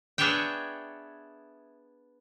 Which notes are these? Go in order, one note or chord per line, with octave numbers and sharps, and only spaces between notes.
B3 D4 G#4 C#5 E5 G5